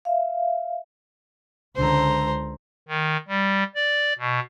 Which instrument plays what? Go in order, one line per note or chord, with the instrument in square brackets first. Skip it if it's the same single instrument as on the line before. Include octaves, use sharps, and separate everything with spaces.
[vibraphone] E5 F5
[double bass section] C#2 D3 [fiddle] C5 A#5
[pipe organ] D#3
G3
D5
B2